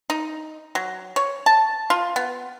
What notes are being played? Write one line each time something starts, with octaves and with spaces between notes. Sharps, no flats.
D#4
F#3
C#5
A5
F4
B3